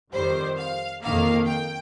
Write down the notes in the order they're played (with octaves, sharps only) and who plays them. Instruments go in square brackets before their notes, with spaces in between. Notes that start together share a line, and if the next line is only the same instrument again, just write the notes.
[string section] F2 D#3 G3 C5
F5
F2 D#3 A#3 F5
G5